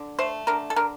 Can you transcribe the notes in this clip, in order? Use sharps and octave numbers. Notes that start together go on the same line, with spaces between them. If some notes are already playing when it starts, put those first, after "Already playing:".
Already playing: D3
A3 C5
D3 A#4
A4
D3 A#4